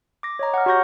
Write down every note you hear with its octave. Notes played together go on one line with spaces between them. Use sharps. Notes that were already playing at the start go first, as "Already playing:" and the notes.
D6 A#6
C#5 D#5 A#5
F#5 F6
F#4 G4 C#5 C#6 G6 A#6